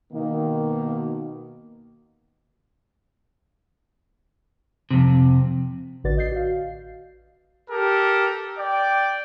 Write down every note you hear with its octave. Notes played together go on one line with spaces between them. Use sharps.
B2 D#3 A#3
F2 C3
A1 D3 F#4 B4 D5 A6
D#5 G6 C7
F#4 F5
G4 A4 A#4
D5 G5